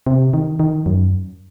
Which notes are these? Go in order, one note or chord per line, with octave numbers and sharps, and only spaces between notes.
C3
D#3
D#3
F#2